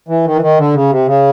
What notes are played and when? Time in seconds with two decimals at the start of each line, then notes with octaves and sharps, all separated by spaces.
0.08 E3
0.25 D#3
0.35 E3
0.41 D#3
0.58 D3
0.74 C#3
0.90 C3
1.07 C#3